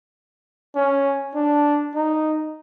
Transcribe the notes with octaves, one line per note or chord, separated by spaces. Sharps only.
C#4
D4
D#4